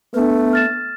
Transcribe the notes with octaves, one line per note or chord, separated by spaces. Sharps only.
A3 B3 D4 B4
F6 A6 E7